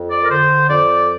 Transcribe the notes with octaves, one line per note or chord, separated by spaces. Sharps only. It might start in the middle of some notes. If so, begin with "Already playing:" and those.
Already playing: F2
D5
A#4
D3 C5
F2 D5